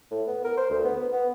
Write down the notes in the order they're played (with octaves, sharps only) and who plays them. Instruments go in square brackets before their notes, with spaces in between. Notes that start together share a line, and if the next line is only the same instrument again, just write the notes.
[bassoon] A2
B3
A#4
C5
D2
B3
B3
B3